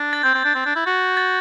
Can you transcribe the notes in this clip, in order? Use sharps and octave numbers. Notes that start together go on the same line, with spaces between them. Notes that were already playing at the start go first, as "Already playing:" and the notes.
Already playing: D4
A6
C4 G6
C4
D4
C4
D4
E4
F#4
A6